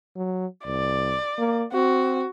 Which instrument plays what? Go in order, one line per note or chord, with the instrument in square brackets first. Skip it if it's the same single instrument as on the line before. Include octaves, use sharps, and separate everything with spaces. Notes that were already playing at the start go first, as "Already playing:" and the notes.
[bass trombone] F#3
[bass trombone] C2 [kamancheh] D5
[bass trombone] A#3
[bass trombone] C4 [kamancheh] F#4